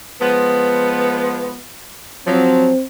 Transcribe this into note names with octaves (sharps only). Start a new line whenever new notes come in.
F3 G#3 B3
F3 F#3 C4